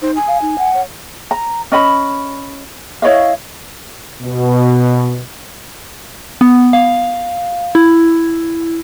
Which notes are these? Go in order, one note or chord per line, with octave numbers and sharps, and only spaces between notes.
D#4 C5
G#5
F5
D#4
F#5
C#5
A#5
C#4 D#5 B5
E4 C#5 D#5 F5
B2
B3
F5
E4